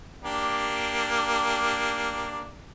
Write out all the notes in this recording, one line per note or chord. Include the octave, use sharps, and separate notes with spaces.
A#3 D4 G4